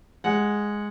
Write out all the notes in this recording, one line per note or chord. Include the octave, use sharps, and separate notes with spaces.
G#3 F#5